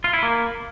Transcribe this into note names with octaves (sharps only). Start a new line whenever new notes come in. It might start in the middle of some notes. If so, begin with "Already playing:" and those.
F4
E4
A#3